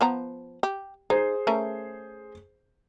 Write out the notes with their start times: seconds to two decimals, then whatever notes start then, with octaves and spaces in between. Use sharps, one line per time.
0.01 F3 B3 A#5
0.63 G4
1.10 D#4 G#4 C5
1.47 A3 C#4 A#4